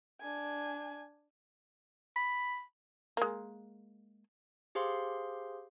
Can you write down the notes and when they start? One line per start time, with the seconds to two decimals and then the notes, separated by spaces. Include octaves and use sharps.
0.22 D4 G#5
2.16 B5
3.17 G#3 A#3
4.75 G4 G#4 C5 F5 C6